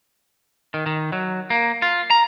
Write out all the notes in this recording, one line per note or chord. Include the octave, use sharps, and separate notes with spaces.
D#3
D#3
F#3
A#3
F4
A#5